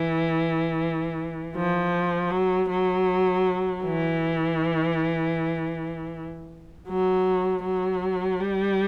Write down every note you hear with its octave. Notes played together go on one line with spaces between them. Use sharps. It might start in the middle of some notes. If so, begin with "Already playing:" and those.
Already playing: E3
F3
F#3
F#3
E3
F#3
F#3
G3